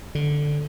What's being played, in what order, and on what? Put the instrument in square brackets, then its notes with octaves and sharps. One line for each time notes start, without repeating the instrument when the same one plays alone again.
[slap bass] D3